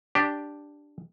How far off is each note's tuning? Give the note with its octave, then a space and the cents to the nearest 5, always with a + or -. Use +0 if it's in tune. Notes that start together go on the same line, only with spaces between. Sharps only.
D4 +0 G4 +0